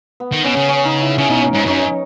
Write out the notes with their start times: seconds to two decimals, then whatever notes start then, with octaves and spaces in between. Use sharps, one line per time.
0.20 B3
0.32 D#3
0.44 B2 C#4
0.56 C#3
0.69 C#4
0.85 D#4
1.01 E4
1.18 C#3 C#4
1.29 B2 D#4
1.42 C#4
1.54 G#2 D#4
1.66 F#2 C#4
1.79 D#4